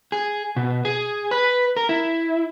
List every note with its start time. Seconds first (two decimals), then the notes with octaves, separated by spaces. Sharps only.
0.12 G#4
0.56 B2
0.85 G#4
1.31 B4
1.77 A#4
1.89 E4